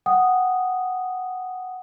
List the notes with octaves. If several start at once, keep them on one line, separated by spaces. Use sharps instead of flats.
F#5 G5 D#6